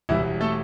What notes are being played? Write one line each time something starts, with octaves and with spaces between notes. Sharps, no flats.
E1 E2 E3 G3 E4
A3 A4